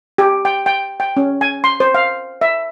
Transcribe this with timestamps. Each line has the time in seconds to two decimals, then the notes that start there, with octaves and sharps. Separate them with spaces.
0.18 G4
0.45 G5
0.66 G5
1.00 G5
1.17 C#4
1.41 G#5
1.64 C6
1.80 C5
1.95 F5
2.41 E5